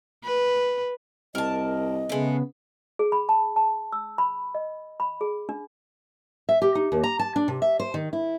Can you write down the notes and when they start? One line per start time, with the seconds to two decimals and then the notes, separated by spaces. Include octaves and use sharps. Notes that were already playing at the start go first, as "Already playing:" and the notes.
0.24 B4
1.35 C2 A#4 D#5 A5
2.09 C#3 G#3 A3 B3
2.99 G#4
3.12 B5
3.29 A5
3.56 A5
3.92 E6
4.18 B5
4.55 D#5
5.00 B5
5.21 G#4
5.49 D4
6.49 E5
6.62 G4
6.75 D#4
6.92 D#2
7.04 A#5
7.19 A5
7.36 D4
7.48 C3
7.62 E5
7.80 C5
7.94 D#3
8.13 E4